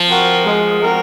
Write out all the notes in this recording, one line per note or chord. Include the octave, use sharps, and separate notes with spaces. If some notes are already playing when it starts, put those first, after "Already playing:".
Already playing: F3
C4 F#4 A#4
G#3
C4 F#4 A#4